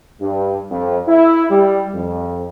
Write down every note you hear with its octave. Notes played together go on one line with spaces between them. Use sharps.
G2
F2
E4
G3
F2